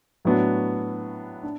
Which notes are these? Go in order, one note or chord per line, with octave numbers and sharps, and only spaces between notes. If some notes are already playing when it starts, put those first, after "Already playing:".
A2 F#3 B3 D4 F#4
D4